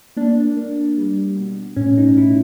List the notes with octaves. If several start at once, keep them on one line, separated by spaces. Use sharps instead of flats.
A#3 D4
A#3
G3
B2
A2 C#4
D#4
A2 E4